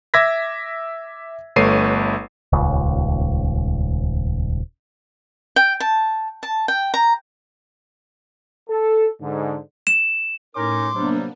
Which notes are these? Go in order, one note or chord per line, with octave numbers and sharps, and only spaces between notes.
E5 D6 E6 G#6 A#6 B6
G1 A3 B4 C#5 C7 D#7
D#1 C#2
G5
A5
A5
G5
A#5
A4
G#2 D3
E7
A2 C#4 D#4 A#4 C6 D6
C3 F#3 G3 A#3 B3 D4